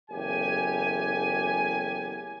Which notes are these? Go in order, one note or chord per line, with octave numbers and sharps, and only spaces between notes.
F#1 E2 A3 G4 G#5